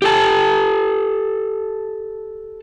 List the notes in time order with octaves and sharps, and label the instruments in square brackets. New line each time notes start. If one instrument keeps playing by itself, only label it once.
[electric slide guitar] G4 A4 A5